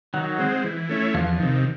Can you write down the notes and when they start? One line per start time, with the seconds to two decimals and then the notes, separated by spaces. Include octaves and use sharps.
0.14 D#3 F#3 F#4
0.39 G#3 C4
0.64 E3
0.89 A3 C#4 E4
1.14 E2 F3 F4
1.39 C3 D#3